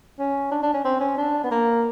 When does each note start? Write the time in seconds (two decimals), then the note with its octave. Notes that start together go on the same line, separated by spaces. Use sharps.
0.19 C#4
0.52 D4
0.63 D4
0.74 C#4
0.85 C4
1.01 C#4
1.18 D4
1.44 B3
1.51 A#3